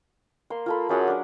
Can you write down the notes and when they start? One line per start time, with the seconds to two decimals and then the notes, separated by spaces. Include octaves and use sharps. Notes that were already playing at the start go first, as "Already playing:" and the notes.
0.50 A#3 C6
0.66 F4 A4 B5
0.89 F#2 F#3 G#4 F#5
1.07 D4 A#4